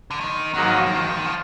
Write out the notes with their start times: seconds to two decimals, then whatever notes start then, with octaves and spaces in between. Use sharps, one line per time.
0.11 D3
0.20 D#3
0.54 G#2 D#3 F#3 A#3 D#4 F#4
0.62 F3
0.70 D#3
0.78 F3
0.86 D#3
0.94 F3
1.02 D#3
1.10 F3
1.17 D#3
1.25 F3